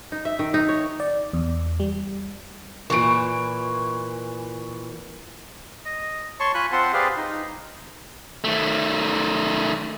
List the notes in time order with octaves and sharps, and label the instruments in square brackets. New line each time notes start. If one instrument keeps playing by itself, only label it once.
[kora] D#4
E5
D#3
D#4
C#5
[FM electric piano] D5
E2
G3
[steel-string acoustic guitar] A#2 E3 [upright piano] C#6 D7
[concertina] D#5
C#5 A5 C6 C#6
F4 G#5 B5 F#6
C4 F4 C5 F#5 A5 C6
G4 G#4 B4 C5 D5 F5
D#4
[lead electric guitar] D#3 A3